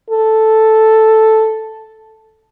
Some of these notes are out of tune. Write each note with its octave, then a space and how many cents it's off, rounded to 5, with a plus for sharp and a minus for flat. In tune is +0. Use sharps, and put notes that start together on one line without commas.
A4 +0